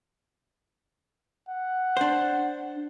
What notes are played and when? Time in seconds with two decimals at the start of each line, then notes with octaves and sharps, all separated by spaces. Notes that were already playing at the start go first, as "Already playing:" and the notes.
1.48 F#5
1.97 D4 C5